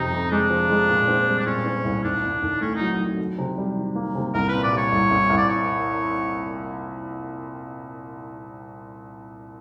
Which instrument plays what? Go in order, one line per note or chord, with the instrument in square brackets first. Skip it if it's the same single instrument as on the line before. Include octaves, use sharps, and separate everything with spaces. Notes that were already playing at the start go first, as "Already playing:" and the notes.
Already playing: [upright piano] F2 C3 [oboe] D#4
[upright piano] F2
[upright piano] G#3 [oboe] D4
[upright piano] F3
G#3
A#2
C4
G3
[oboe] D4
[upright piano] A#2 [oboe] C#4
[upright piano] C4
C2
[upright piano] D#2 [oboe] D4
[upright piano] D#2
D#2
[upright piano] A3 [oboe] C#4
[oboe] D#4
[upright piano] F#3
F#3
D#3
C3
G3
D#3
A#3
C3
[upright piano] C2 [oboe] A#4
[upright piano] A#2 [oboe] B4
[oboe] D5
[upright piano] G3
[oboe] C#5
[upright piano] C2
C2
C2
[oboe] D5
C#5